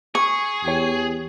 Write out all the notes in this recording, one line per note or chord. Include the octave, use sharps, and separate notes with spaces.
G#4 C#6
E2 G4 C#5